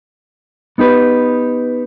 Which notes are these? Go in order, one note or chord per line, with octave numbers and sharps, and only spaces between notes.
B3 D#4 G4 B4